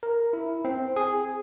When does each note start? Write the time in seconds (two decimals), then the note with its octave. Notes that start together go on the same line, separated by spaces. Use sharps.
0.03 A#4
0.33 E4
0.65 C4
0.96 G#4